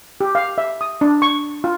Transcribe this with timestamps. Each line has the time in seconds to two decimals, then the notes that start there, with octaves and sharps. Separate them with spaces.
0.21 G4
0.35 F5
0.58 E5
0.81 D#6
1.01 D4
1.22 C#6
1.64 F4